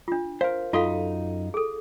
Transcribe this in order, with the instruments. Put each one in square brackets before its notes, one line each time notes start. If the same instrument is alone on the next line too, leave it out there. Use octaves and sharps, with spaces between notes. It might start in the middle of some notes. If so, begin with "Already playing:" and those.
[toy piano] D4 F4
[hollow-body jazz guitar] A#4 C5 [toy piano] F5
[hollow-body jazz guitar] F#2 D#4 C6 [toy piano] F4 A4 F5
[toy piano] G#4 A4